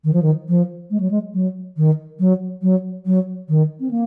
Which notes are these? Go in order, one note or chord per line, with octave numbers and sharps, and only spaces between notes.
D#3
F3
D#3
F3
G#3
F#3
G#3
F#3
D#3
F#3
F#3
F#3
D#3
C4
A#3